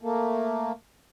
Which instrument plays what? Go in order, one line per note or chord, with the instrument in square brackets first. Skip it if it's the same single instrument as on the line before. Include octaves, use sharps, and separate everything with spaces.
[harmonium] A3 A#3